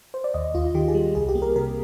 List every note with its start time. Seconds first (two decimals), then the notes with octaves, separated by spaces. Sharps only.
0.14 C5
0.24 D5
0.34 D#2 D#5
0.54 D#2 F4
0.74 D#3 G4
0.88 G#4
0.95 G3
1.15 C2 G#4
1.29 G4
1.35 A#3
1.42 A#4
1.55 C3 A#4